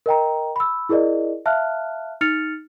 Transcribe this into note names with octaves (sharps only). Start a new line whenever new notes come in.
A#4 D#5 G5 A#5
B5 E6
E4 G#4 A#4 D5 D#5
E5 F5 A5 F6 F#6
D#4 F6 A6 C#7 F7